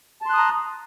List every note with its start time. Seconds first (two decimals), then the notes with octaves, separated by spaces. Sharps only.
0.22 A5
0.26 C6
0.30 F#6
0.34 D#6
0.38 A#5